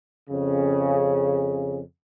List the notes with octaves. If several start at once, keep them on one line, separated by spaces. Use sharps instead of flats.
F2 C#3